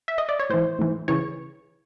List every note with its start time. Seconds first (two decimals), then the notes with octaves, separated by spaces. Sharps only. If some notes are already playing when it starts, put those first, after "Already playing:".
0.08 E5
0.18 D#5
0.29 D5
0.39 C#5
0.50 A2 E3 C5
0.79 A2 E3
1.08 C#3 E3 C#5